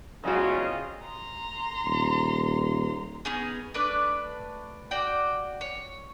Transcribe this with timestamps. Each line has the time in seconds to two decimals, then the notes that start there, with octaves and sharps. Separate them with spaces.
0.24 E2 C#3 F#3 G#3 C4 F4 F#4 D#5
1.05 A#5 C6
1.85 D#1
3.25 B3 C#4 D#4 G#4
3.74 A3 D4 B4 D5
4.91 F#4 D5 G5
5.61 C#5